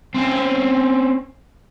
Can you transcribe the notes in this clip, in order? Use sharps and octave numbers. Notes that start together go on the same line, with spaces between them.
C4 C#4